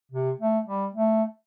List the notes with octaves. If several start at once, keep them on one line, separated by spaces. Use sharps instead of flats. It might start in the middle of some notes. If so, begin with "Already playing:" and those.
C3
A3
G3
A3